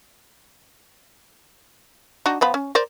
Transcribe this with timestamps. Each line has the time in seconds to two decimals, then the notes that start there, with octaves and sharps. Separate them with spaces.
2.26 D4 D#4 F#4
2.41 F3 B3 B5
2.54 C#4
2.75 A#4 C5 D5